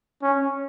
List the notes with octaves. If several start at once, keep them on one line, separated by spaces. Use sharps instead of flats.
C#4